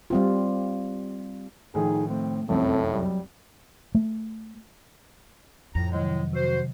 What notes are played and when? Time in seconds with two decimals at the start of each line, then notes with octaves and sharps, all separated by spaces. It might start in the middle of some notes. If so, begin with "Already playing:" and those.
0.10 G3 C4 F4
1.75 A2 D#3 F3 D#4 G#4
2.08 A3 C4
2.49 F1 C2 F#2 A2 C4 A4
2.93 F#3 G3
3.95 A3
5.75 F2 A2 A#5
5.92 A2 C3 D#3 F#3 G#3
6.34 C3 F#4 C5